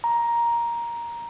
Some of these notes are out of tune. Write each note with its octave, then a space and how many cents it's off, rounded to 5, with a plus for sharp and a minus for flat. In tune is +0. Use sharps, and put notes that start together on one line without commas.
A#5 +10